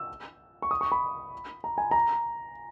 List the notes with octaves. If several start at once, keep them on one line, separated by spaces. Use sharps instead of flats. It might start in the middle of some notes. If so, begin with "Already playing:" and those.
Already playing: E6
C#6
D#6
C#6
B5
A#5
G#5
A#5